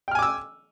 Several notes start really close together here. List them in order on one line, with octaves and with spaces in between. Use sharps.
G5 F6 G#5 D6 E6